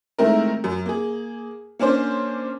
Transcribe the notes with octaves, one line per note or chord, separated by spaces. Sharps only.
D#3 G#3 A3 C4 E4 A#4
F#2
A#3 G#4
A#3 C#4 D4 C5